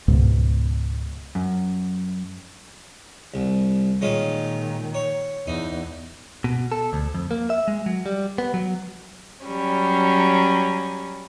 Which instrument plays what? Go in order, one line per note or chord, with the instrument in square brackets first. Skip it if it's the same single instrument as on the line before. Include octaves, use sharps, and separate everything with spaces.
[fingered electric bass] C#2 G#2 B2
[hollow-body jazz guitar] F#2
[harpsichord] C2
[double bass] A#2 D#3 [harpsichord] G#3 C#4 F4
[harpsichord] C#5
[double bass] E2 [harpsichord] D#4
[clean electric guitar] B2
A4
D2
F2
A#3
E5
G#3
F#3
G3
B3
F#3
[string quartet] F#3 G3 C#4